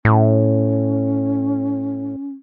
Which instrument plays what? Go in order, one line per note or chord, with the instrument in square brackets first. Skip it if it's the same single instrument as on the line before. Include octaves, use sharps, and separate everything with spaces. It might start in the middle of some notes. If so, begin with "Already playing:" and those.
[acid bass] A2 [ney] C#4